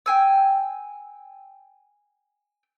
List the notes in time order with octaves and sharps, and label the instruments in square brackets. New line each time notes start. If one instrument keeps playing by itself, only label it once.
[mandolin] G5 G#5 E6